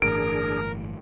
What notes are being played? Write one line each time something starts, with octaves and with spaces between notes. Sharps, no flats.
G1 A2 E3 D4 G#4 A#4 D7